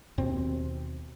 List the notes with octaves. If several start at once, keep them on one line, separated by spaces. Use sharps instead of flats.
D#2 B2 C4